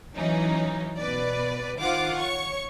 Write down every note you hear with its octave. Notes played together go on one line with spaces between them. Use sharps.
E3 F#3 C#4 D#4
B2 B4 D5
D#3 F4 C5 F5 F#5 D6
C#5 C#6